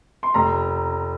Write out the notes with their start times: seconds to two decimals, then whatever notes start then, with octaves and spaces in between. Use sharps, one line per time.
0.23 C6
0.34 F1 A#5